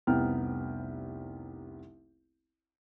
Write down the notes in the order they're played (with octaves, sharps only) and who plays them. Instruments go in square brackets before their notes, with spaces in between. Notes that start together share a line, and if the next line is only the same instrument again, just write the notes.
[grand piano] F1 C2 B3 G5 A#5 F6